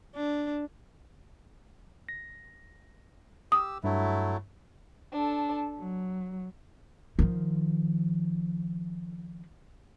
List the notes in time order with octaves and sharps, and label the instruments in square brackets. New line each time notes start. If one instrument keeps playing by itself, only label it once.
[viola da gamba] D4
[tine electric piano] A#6
[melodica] G4 E6 [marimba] D#6
[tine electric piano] G2 [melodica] F#3 A3 E4
[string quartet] D4 A4
F#3
[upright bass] D#3 F3